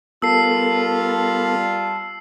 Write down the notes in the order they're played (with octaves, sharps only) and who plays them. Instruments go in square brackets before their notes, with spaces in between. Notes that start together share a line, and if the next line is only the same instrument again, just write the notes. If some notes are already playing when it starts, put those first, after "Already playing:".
[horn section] G3 F4 [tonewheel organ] B3 A4 A#4 [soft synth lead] A5 [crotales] E6 C7